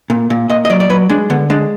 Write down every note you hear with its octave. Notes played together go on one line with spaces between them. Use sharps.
A#2
A#2
A#2 D#5
D#5
F#3 D5
D5
F#3 B4
G#3 D4
D3 B3
G#3 D4